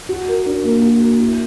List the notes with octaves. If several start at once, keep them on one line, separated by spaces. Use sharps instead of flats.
F#4
A#4
D4
A#3
F#4
A#4
E4